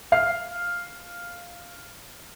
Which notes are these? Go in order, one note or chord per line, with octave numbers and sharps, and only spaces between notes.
F5 F6 C7